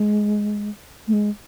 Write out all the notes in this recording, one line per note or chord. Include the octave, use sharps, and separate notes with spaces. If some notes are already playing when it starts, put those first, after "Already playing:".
Already playing: G#3
A3
G#3